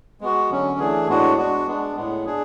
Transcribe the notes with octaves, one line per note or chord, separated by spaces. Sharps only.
G#3 B3 F#4
D3 F#3 C#4
E3 A3 D4 G#4
A2 G#3 B3 D4 F#4
G#3 D4 F#4
G#3 B3 D4
A2 G#3 B3
D4 G#4